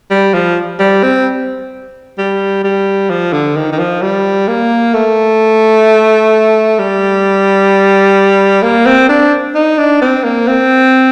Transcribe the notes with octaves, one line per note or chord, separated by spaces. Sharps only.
G3
F3
G3
C4
G3
G3
F3
D3
D#3
D#3
F3
G3
A#3
A3
G3
A#3
C4
D4
D#4
D4
C4
A#3
C4